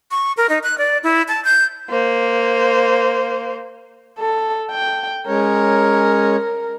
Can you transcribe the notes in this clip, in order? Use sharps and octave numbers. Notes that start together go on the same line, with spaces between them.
C#6
A#4
D#4
F#6
D5
E4
A5
G6
A#3 C5
A4
G5
G#3 C#4 A#4 C#5